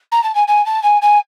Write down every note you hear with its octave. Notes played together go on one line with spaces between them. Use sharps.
A#5
A5
G#5
G#5
A5
G#5
G#5